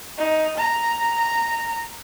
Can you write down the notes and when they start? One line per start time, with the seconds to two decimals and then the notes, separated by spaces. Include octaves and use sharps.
0.18 D#4
0.57 A#5